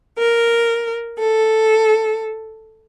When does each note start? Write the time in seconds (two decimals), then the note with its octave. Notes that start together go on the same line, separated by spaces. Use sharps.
0.18 A#4
1.19 A4